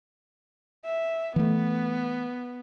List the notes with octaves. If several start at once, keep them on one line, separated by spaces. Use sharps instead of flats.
E5
E3 A3 B3